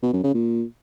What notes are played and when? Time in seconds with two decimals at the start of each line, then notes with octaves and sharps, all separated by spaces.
0.03 B2
0.13 F#2
0.24 C#3
0.34 A#2